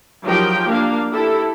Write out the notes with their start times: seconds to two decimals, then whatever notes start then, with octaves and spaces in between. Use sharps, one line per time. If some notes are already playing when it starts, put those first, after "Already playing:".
0.25 F3 F#3 D#4 G4 A#4 G5
0.70 A#3 D4 F5
1.13 E4 G4 A4